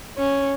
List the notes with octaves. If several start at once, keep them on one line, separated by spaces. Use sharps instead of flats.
C#4